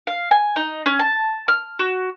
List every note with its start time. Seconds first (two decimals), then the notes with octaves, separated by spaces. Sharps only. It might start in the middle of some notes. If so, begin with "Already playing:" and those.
0.07 F5
0.31 G#5
0.56 D#4
0.86 C#4
0.99 A5
1.48 F6
1.79 F#4